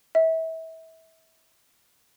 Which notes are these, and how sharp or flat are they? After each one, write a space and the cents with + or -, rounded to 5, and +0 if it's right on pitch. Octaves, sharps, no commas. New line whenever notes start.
E5 -30